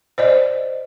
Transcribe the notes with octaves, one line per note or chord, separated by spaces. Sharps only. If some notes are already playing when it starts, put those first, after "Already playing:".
C5 D5 D#5